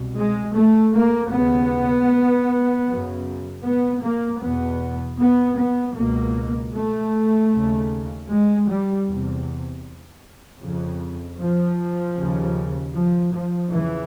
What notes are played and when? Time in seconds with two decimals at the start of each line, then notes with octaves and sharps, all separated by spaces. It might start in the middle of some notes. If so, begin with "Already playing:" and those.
Already playing: C2 B2
0.15 G#3
0.54 A3
0.94 A#3
1.32 D#2 C#3 B3
2.88 F#2 C#3
3.64 B3
4.03 A#3
4.41 E2 B2 B3
5.20 B3
5.59 B3
5.96 C#2 B2 A#3
6.74 A3
7.52 D#2 C#3
8.30 G#3
8.67 G3
9.07 E2 C3
10.62 F2 C#3
11.40 F3
12.17 D#2 C#3
12.94 F3
13.32 F3
13.72 E2 C#3 E3